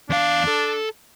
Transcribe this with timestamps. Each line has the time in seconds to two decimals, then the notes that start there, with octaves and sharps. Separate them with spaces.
0.10 E2 D4 F5
0.48 A4